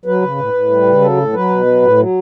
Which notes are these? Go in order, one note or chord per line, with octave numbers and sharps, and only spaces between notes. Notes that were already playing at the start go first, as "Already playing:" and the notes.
F#3 B4
C#3
A2
A2
G3
C#3
F#3 A4
A2
F#3 B4
B2
F#3
A2
F#3